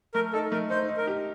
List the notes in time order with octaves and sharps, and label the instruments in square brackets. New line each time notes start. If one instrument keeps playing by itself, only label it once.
[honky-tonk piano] A3 [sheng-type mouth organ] A#4
[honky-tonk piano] D#4 [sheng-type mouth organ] A4
[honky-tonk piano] A3 [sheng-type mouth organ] A#4
[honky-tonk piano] D#4 [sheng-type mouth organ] C5
[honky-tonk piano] D#4
[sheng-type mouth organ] A#4
[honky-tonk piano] G4